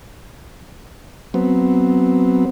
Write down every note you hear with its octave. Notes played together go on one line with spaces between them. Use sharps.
F#3 B3 C4